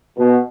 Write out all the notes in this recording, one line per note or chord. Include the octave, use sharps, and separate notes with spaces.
B2